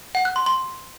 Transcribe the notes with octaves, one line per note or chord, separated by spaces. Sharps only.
F#5
F#6
C6
C6